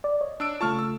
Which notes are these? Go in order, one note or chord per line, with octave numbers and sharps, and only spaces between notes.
D5
C#5 D#5
D4 E6 D7
C#3 A3 F4 A5 C#6 F6
E6